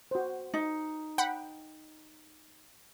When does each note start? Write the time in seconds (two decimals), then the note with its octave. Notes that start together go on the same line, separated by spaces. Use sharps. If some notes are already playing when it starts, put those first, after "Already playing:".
0.11 F#4 C5
0.54 D#4
1.18 F#5 G5 B5